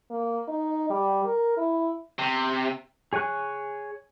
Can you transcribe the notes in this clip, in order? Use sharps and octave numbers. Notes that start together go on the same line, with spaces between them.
A#3
D#4
G3
A#4
E4
C3
G#4 C#5 G#5 F#6